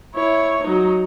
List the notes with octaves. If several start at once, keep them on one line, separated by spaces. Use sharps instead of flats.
E4 C#5
F#3 D#4